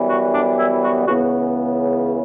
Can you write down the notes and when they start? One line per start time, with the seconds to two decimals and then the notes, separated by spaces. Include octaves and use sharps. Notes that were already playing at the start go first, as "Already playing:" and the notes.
Already playing: F#2 E3 G3 B3
0.09 F#4
0.33 D4
0.57 E4
0.82 F#4
1.06 C#2 C#3 E3 B3 F#4